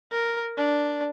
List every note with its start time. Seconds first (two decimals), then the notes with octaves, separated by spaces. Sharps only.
0.12 A#4
0.58 D4